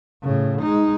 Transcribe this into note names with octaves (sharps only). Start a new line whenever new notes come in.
A2 C#3
G#3 D#4